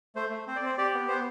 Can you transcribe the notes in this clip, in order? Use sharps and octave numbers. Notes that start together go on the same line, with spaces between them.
A3 C5
A3
C4 C5
D5
C4 C5
G4 D5
B3
B3 C5